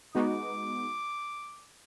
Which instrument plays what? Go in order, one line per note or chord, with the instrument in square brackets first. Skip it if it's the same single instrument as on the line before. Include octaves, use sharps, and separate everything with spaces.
[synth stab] G#3 B3 D#4 F#4 [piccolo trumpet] D6